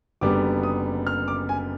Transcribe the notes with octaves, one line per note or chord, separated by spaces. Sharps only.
F#1 F#2 D3 G3 B3 D6
D#6
F6
D6
G#5